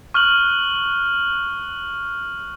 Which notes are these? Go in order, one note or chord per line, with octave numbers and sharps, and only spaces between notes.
C#6 F6 F#6 F#7